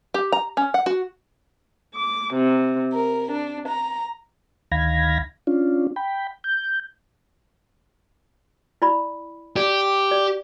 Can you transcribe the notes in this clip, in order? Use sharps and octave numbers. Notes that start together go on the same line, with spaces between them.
G4
A#5
C#4
F#5
F#4
D6
C3
A#4
D4
A#5
D2 D#3 F5 B5 G#6 A#6
C#4 D4 F4
G5 B5
G6
E4 D5 B5
G4 D5
D5